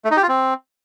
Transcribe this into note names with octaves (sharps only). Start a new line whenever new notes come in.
A3
D#4
G4
F4
C4